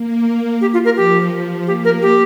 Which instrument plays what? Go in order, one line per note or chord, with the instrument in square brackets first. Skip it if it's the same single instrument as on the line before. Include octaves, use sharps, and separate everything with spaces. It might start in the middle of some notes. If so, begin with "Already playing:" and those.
Already playing: [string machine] A#3
[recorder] G4
F4
A#4
[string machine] F3 [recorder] G4
[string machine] F3
[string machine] A#3 [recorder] G4
[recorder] A#4
G4